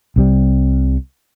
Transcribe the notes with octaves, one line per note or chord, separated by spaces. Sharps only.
C2 C3 G3